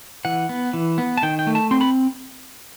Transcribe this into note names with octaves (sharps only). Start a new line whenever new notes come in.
E3 F#5
B3
E3
B3
A5
D#3 G5
G5
A3
A5
C4 C6
B5